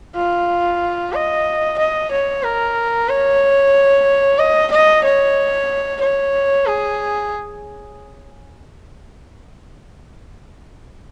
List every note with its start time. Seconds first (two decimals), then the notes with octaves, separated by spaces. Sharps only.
0.16 F4
1.13 D#5
1.78 D#5
2.11 C#5
2.43 A#4
3.08 C#5
4.39 D#5
4.71 D#5
5.04 C#5
6.01 C#5
6.66 G#4